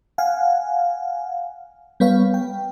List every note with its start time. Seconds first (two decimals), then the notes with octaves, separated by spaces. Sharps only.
0.18 F5 F#5 G#5
2.00 G3 B3 B4 C#5 F5
2.34 G5